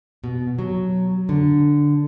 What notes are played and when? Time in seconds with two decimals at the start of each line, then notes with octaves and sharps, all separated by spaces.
0.24 B2
0.59 F#3
1.29 D3